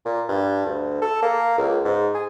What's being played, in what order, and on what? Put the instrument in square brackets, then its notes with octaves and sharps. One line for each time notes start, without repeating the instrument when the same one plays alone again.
[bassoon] A#2
G2
D2
A4
A#3
C#2
G#2
G#4